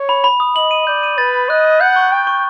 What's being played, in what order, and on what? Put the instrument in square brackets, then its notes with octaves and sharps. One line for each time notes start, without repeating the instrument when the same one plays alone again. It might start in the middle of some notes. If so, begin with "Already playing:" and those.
Already playing: [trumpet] C#5
[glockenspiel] B5
B5
D#6
[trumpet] D#5 [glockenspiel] F#7
[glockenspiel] D#7
[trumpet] D5 [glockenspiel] G6
[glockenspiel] D#7
[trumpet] B4 [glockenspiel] A6
[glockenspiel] A6
[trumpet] D#5 [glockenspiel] F#6
[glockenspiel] F#6
[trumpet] F#5 [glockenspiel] G6
[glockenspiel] C#6
[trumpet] G5 [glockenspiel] C#6
[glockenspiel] C#6